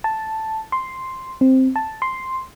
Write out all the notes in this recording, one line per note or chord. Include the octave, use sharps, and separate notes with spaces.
A5
C6
C4
A5
C6